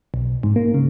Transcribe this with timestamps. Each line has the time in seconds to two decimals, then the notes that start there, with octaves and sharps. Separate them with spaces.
0.14 B1
0.43 G#2
0.56 A#3
0.74 C#3